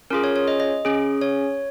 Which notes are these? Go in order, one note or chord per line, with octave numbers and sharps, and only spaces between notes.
C#4 F4 G#4 A#4
C#5
C#5
D#5
D#5
C#4 G#4
C#5